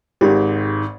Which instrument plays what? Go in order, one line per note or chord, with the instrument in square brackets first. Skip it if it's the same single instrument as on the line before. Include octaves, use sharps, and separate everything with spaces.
[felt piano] G#1 G#2 [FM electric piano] G4